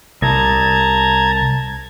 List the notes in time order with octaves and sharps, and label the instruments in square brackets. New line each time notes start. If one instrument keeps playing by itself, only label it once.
[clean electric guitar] C2 [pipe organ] A5 A#5 G#6